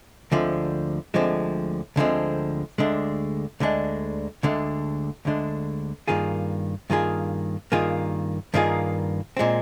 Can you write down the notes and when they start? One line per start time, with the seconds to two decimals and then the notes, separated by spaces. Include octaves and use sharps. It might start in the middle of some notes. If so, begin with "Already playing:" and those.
0.32 D2 D3 F3 G#3 C4
1.14 D2 D3 F3 G#3 C4
1.96 D2 D3 F3 G#3 C4
2.78 D2 D3 G#3 D4
3.60 D2 D3 G#3 D4
4.43 D2 D3 G#3 D4
5.25 D2 D3 G#3 D4
6.08 G2 D#3 A#3 F4 G#4
6.90 G2 D#3 A#3 F4 G#4
7.72 G2 D#3 A#3 F4 G#4
8.54 G2 D#3 A#3 F4 G#4
9.37 A#2 G#3 C4